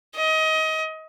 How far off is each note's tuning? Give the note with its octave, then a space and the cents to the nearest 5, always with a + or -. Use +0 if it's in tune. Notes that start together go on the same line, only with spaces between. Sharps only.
D#5 +25